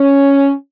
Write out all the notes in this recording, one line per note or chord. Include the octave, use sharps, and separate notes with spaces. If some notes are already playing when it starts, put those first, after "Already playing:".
Already playing: C#4